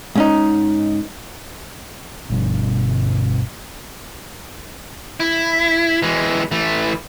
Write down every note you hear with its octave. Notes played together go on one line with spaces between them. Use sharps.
G#2 C#4 D#4
G1 B2 G3
E4
E3 G#3
E3 A3